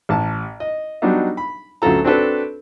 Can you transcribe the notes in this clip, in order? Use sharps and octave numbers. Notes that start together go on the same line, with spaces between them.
A1 A5
D#5
F#3 G3 B3 D4 D#4
B5
D2 C#3 F#3 F4 A4 A#5
C4 D4 F#4 A4 B4